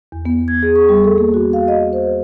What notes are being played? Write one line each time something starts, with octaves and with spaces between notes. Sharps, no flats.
E2
B3
G#6
G#4
C#6
G3
A4
A#3
F#4
F5
D#5
C5